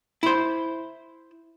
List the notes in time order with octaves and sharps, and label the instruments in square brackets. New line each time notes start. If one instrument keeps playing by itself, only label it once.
[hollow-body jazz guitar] E4 C5